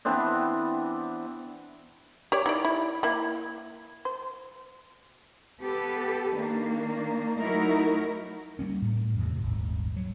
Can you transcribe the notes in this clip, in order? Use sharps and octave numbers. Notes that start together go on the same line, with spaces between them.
E3 B3 C4 D4
G4 C#5 D5
D#4 E4 D5
E4
A#3 E4
C5
B3 G4 A4 B4
D#3 A#3 D4
F#3 A3 D#4 E4 F#4 A#4
G3 A#3 C#4
A2
E2 A2 C3
D#1 G#1
F#3